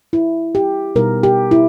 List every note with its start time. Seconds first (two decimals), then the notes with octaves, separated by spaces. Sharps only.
0.13 E4
0.55 G4
0.95 B2 G3 B3 D#4 A#4
1.23 G4
1.51 E4